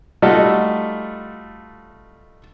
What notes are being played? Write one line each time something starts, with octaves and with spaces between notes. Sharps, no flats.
G3 A3 D#4 F4 F#4 A4